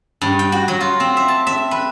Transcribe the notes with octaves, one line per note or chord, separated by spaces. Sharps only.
G2
G5
F#4
F#3
F4
C4
E5
A5
E5
B4